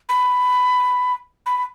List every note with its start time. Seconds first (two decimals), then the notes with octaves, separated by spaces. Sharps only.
0.09 B5
1.46 B5
1.57 B5